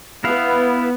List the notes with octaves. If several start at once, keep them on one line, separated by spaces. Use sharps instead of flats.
B3 E4 F5